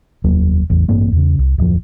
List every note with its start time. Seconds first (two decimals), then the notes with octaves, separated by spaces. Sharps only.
0.24 F1 D#2 F#3 A#3
0.70 A1 E2
0.88 A1 G2 A#3 C4
1.12 E2 C#3
1.39 C2
1.58 D1 F2 F3